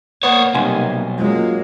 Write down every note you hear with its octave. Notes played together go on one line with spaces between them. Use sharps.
A#3 B3 C5 C#5
B1 C3 G3 G#5 C6
F#3 G#3 A#3 C#4 F4